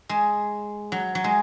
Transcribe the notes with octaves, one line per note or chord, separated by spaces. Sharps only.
G#3
F#3
F#3
G#3